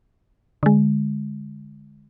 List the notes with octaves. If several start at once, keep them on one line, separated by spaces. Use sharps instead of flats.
D3 G#3